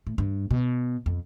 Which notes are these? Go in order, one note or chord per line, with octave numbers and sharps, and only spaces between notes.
A2
G2
B2
F2